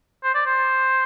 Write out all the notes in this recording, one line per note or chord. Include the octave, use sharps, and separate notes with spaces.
C5
D5
C5